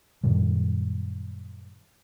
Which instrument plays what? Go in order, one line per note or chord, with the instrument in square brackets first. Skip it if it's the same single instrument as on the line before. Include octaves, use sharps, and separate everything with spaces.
[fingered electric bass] F#2 A#2 D#3 G3